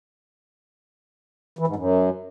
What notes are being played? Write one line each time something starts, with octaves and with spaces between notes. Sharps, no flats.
E3
G#2
F#2